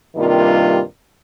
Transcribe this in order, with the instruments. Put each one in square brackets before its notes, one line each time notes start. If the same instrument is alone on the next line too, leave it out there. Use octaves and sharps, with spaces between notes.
[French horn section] G2 C3 D#3 G3 A#3 F4